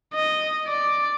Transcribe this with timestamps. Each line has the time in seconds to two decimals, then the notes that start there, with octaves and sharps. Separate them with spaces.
0.14 D#5
0.68 D5